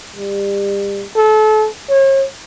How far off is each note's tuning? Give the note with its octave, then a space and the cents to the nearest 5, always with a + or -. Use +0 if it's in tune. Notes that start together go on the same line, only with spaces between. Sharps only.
G3 +30
A4 -30
C#5 -40